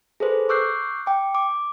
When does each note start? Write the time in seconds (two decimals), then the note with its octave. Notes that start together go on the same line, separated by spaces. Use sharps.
0.20 G#4 A4 B4 C5
0.49 C#6 D6 E6 F#6 G6 C7
1.06 G5 D6
1.35 D6